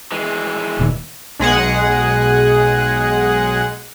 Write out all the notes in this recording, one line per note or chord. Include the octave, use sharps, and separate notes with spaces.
E3 G#3
D#1 A#2 D#3
B1 G#3 G#4 F#5